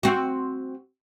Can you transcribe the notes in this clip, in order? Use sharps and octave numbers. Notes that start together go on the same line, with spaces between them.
C4 F#4